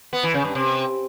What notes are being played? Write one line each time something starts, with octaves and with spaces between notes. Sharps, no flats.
B3
E3
C#3
G2
C3